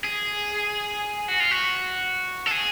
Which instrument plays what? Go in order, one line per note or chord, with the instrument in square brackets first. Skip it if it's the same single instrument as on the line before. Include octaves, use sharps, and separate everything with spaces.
[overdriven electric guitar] G#4
F#4
F4
F#4
A4
G#4